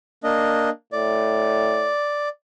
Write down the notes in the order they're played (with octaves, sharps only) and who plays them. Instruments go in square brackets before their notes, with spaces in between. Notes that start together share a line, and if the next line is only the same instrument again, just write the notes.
[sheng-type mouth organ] A#3 D4 D#5
[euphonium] A2 [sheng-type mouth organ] D5